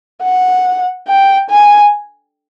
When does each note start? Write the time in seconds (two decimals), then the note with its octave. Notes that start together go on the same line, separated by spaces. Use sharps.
0.23 F#5
1.08 G5
1.50 G#5